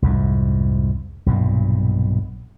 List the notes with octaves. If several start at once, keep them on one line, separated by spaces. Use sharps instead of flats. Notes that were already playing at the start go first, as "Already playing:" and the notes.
C2 F2 G#2
B1 G2 A#2